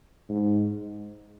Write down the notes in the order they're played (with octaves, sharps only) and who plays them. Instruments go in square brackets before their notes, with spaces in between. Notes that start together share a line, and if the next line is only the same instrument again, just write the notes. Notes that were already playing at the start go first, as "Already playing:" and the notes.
[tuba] G#2